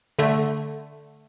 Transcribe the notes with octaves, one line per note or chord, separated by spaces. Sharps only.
D3 A3